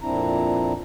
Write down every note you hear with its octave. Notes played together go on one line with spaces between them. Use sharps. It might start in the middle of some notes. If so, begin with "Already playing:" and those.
F2 A#2 C4 D4 E4 A#5